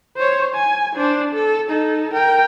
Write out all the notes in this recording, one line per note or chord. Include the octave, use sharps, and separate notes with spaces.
C5 C#5
G#5
D4 C5
A4
D#4 A4
A#4 G5